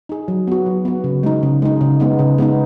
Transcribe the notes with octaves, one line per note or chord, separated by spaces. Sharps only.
D#4 G#4
F#3
B3 F#4
F#3
B3 F#4
C#3
G#3 D#4
C#3
G#3 D#4
C#3
G#3 B3 D#4
C#3
G#3 B3 D#4